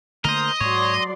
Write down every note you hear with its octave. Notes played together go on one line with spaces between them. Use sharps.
D3 A3 A#3 A#4 C5 D#5
G#2 F#3 C#5 D5 C6